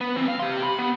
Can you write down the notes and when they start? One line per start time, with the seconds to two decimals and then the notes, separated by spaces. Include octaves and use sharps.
0.01 B3
0.16 E3 C4
0.28 F5
0.40 G4 C6
0.63 B5
0.79 B3